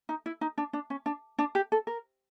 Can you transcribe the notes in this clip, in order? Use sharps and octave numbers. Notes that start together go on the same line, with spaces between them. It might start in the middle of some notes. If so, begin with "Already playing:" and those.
D#4
E4
D#4
D4
D4
C#4
D4
D4
G4
A4
A#4